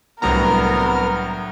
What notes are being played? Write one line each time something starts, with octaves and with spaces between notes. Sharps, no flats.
C2 A2 F#3 B3 D4 A#4 A#5 F6